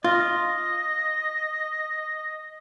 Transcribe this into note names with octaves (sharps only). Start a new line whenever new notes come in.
F4 D#5